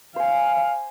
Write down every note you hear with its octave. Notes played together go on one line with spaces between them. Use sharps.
C5 F5 G#5